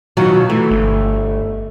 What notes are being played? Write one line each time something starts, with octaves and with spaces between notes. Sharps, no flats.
B2 D#3 F#3 F4
E3 A3
G1